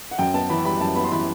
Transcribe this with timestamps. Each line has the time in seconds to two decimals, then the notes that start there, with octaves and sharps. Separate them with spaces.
0.11 F#5
0.19 F#2 G5
0.34 B3 A5
0.50 E3 B5
0.65 G3 B5
0.81 F#2 A5
0.96 B3 B5
1.05 C6
1.12 E3 B5